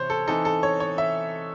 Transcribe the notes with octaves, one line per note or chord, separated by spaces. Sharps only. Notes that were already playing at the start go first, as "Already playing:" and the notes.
Already playing: C3 E3 C5 C#5
A4
E3 C4 D#4 A4
A4
C#5
C#5
E5